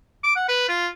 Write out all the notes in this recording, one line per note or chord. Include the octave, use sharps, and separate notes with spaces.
D6
F#5
B4
F4